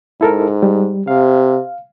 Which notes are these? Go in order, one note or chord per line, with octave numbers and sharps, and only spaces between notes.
G#2 E4 A4 A#4
G3
C3 F5